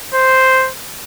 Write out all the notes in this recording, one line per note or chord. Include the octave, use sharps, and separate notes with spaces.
C5